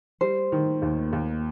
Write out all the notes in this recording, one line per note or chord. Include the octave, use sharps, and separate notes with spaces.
G3 C5
D#3
D#2
D#2